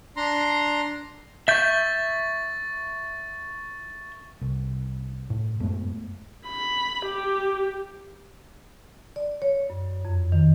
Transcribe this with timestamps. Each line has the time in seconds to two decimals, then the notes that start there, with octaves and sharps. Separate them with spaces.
0.17 D4 A#5 C6
1.48 E5 C#6 G6 A6
4.41 C2
5.30 A2
5.60 F#2 G#3 A3 B3
6.47 B5
7.06 G4
9.16 D5
9.42 C#5
9.70 F#2
10.05 F2
10.32 D#3